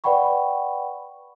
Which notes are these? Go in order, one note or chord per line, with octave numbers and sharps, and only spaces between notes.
B4 D5 F#5 G5 B5 C#6